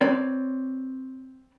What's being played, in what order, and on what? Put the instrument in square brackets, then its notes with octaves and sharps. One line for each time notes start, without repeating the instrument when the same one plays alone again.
[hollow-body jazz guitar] C4 B4 C#5 D5